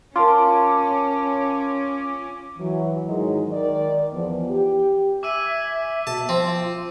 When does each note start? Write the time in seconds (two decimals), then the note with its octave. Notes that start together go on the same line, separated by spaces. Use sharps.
0.16 C#4 F4 A#4 A5 C6 D6
2.58 E3 F#3
3.08 G#2 D#3 F#3 G#3 D#5
3.53 D#3 D5
4.12 E2 F3 B3
4.50 G4
5.23 E5 G#5 D6 E6 D#7
6.07 B2 A5
6.29 F3 C4